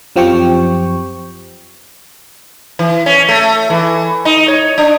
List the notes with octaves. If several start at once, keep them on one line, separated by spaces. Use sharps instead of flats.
F#2 F3 C4 G4 G5 C#6
E3
C#4
A3
E3
D#4
C#5
D4